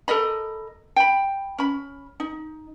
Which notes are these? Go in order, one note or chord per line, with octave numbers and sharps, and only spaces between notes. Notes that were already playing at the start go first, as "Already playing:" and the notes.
A4 A#4 D#5 B5
G5 B5
C#4 B5
D#4